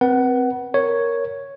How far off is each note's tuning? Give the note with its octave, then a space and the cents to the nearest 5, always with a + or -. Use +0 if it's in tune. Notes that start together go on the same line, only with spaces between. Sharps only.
C4 -5 B4 -30 F#5 +20
A#4 +0 C#5 +0